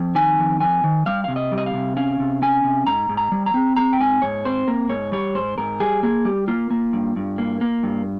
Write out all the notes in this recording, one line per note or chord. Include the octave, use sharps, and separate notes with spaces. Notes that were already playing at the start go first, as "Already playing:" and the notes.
Already playing: F2
D#3 G#5
F2
F2 G#5
D#3
G3 F5
C3 F5
D#5
G3
D#5
F5
C3
C#4 F5
C3
C#4 G#5
C3
G#2 A#5
G#2
A#5
G3
A#5
C4
C4 A#5
G5
G#2 G#5
G#2 C#5
C4 C5
A#3 A#4
G#2 C#5
G3 C#5
G#2 C5
G#2 A#4
G3 G#4
A#3 G#4
G3 G4
A#3 F4
A#3
G2
G2
A#3
A#3
G2